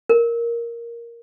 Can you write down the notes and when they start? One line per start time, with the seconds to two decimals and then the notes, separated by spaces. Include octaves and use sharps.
0.09 A#4